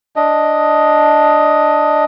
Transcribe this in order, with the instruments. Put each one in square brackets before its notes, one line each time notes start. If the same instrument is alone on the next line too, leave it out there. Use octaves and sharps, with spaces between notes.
[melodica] D4 D#5